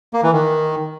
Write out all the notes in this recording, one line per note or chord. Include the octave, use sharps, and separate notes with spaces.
A#3
E3
D#3